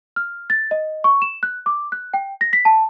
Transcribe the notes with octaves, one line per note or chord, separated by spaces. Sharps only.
F6
A6
D#5
C#6
E7
F#6
D6
F#6
G5
A#6
B6
A5